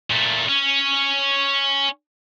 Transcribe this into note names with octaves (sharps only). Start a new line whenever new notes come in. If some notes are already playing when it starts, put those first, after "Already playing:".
A#2 A3
C#4